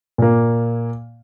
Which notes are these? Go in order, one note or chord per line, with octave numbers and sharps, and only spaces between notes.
A#2 A#3